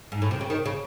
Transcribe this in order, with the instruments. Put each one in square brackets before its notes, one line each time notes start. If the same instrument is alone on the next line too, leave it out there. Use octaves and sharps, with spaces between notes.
[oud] G#2
A2
C3
C#3
D#3
C#3